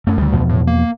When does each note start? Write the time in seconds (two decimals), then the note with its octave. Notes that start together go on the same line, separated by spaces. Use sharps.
0.07 F#2 A3 C#4
0.18 D2 D3 G3
0.33 E2 B2 F3
0.49 A2
0.67 A#3